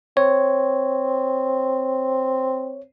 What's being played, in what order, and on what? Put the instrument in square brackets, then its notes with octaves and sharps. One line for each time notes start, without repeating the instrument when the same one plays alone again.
[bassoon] C4 [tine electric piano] C#5